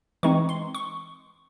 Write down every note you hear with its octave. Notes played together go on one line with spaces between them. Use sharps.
E3 G#3 C4 D#4 C#6
C6
C#6